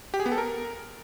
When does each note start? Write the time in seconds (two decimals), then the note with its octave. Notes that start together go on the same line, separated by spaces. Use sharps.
0.14 G4
0.20 G#4
0.26 B3
0.32 A4
0.38 A#4